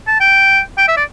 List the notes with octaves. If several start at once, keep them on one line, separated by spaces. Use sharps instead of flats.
A5
G5
G5
E5
D5